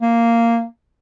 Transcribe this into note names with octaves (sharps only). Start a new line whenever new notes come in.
A#3